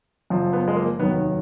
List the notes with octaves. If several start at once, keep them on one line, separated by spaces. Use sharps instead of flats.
F#1 F#2 F3
B3
G#3
A#3
F1 D#2 D#3 F#3 B3